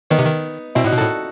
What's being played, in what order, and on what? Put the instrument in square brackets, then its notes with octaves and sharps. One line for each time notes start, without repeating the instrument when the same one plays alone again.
[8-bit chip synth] D#3 [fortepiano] B3 D#4
[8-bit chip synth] C3
D#3
[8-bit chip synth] B2 [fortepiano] C4 E4
[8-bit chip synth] A2 [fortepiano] D#4 F#4
[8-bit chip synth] B2
[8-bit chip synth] A2 [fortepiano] F#4 A4